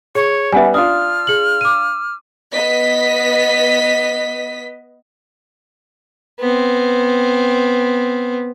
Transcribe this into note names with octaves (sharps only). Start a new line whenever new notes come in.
G#4 C#5
G3 B3 E5 F#5 G#5
D4 F4 D#6 F6
G#4 F#7
D6 D#7
B3 D#5 B6
B3 C4